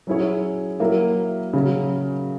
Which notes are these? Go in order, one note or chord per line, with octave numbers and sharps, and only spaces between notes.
F#3 C#4 E4 G#4 C#5
F#3 A#3 E4 A#4 E5
C#3 F#3 C#4